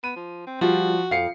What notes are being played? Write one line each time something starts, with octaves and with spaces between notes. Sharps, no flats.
B3 D#7
F3
C4
F3 G3 F4 F#4
F2 F5 C7 C#7